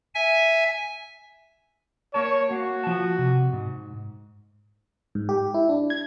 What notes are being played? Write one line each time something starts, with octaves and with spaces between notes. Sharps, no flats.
E5 G#5
A#3 A#4 C#5 A5
A#3 F#4 F5
F3 A5
C3
G#2
G#2
G4
E4
D4
G#6